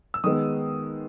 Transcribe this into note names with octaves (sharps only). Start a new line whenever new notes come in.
E6
D#3 G#3 B3 D#6